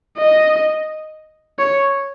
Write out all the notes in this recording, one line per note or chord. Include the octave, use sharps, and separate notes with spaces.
D#5
C#5